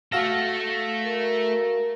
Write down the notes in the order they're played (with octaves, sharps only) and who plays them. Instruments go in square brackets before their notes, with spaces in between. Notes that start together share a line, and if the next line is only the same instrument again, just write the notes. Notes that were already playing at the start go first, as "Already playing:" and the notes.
[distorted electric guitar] A3 A4 [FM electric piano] F#4 F5 A#6
[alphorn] A#4